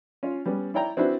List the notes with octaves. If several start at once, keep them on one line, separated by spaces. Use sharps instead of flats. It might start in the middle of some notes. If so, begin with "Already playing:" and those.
C#4 F4
G3 B3 C#4
E4 C#5 D5 G5 A#5
C4 D4 E4 F#4 B4 C5